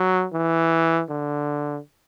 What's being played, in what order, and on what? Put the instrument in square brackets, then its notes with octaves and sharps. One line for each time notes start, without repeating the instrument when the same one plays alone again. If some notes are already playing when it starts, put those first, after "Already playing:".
Already playing: [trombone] F#3
E3
D3